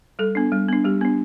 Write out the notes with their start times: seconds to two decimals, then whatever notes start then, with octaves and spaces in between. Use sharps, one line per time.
0.19 G3 A4
0.35 B3 D4
0.52 G3
0.69 B3 D4
0.85 G3 G4
1.01 B3 D4